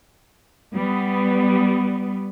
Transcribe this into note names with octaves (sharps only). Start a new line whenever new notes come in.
G3 B3